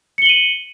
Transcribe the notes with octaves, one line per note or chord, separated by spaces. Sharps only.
C#7 D#7 F#7 G7